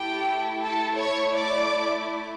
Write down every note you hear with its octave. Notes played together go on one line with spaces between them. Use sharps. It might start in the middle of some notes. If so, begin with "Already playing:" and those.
Already playing: A3 E4 G4 A4 G5
A4 A5
C#5 C#6
D5 D6